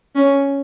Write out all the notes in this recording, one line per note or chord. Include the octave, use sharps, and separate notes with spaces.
C#4